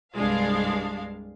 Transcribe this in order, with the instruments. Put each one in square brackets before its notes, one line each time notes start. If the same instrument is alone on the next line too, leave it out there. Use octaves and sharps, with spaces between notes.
[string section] C2 G2 G#3 D4 F5